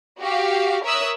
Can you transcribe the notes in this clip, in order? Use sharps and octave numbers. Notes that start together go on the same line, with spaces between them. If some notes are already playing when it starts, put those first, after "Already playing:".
F#4 G4 F5
A#4 C#5 E5 D#6 E6 F#6